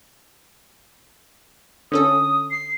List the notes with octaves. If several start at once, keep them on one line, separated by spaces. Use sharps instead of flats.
D3 C#4 A4 D#6
C7